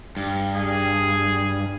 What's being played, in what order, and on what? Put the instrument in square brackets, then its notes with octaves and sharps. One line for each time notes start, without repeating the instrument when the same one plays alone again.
[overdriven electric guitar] G2
[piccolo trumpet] G#4